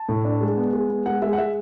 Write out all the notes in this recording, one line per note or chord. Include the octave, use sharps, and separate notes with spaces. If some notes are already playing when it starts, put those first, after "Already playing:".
Already playing: A5
A2
D4
G#3
B3
G#3
B3
G#3 F#5
G#3 E5
F#5
G#3 E5